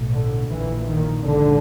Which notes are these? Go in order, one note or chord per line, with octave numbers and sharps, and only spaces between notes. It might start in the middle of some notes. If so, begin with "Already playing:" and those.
Already playing: B1 A2
D3
A#1 A#2 E3
D#3
A#1 G#2 D3